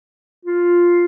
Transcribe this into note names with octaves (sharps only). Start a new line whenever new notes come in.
F4